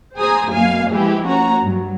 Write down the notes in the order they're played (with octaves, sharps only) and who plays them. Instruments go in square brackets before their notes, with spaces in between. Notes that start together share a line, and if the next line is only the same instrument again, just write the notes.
[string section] G#4 C5 G#5 A#5 D#6
F#2 B2 A#3 F5 G#5
E3 F3 G#3 E4 G4 G#4
A#3 C#4 F#4 A#5
G2 F#3